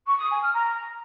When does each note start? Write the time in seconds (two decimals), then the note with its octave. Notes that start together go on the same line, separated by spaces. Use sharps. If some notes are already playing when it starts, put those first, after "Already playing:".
0.06 C#6
0.18 D#6
0.30 G#5
0.42 F6
0.54 A#5